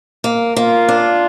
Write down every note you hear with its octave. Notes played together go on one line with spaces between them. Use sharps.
A#3
A#3 F4
D4